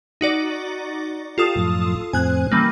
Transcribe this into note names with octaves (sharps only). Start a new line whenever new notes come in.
D#4 F#4 D5
F4 G4 A4 D#6
F#2 A2 F3
F2 A2 C4 G#5 F#6
C#3 E3 G3 A#3